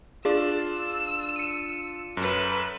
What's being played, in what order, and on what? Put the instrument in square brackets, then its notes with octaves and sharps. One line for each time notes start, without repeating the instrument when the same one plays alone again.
[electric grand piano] D4 F4 D5 [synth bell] G#4 [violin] E6
[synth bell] C#7 D#7
[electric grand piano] F#2 [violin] A4 B4